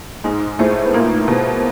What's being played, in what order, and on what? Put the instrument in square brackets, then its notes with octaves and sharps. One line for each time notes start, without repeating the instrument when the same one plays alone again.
[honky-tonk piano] G#2 G#3 [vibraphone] D#4
[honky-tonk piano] A2 A3 [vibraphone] G#4 C5
[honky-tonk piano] B3
[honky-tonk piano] A#2 A#3 [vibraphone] D#4
[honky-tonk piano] B2 B3 [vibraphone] G#4 C5